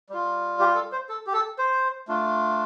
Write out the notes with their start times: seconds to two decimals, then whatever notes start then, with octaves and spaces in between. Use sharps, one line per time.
0.10 G3 F4
0.60 G4
0.75 A4
0.92 C5
1.09 A4
1.27 G4
1.33 A4
1.58 C5
2.08 A3 D4 F4